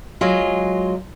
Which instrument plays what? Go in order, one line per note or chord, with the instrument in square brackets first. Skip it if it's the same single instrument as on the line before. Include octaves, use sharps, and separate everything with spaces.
[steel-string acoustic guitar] F#3 G#3 F4